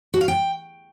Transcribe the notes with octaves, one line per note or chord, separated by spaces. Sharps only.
F#4
F5
G5